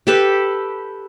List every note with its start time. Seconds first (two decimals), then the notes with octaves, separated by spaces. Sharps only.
0.07 G4 A4 B4